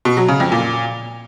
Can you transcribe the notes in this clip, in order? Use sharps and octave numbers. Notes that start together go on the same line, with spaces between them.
B2
F#3
C#3
F2
A#2